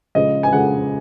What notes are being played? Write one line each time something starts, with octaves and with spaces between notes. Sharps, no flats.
C#3 F3 G#3 D#5
G#5
C#3 F3 G#3 F#5